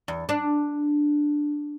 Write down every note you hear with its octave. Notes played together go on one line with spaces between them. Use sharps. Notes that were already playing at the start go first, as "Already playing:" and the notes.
E2
D4